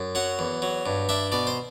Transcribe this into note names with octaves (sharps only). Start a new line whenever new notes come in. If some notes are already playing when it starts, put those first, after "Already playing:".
Already playing: F#2
F#3 F#5
E2
F#3
G2
D4 E5
B2 D5
C5